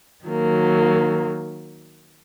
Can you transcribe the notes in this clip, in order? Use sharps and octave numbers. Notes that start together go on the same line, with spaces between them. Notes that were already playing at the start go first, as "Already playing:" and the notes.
D#3 F#3 A#3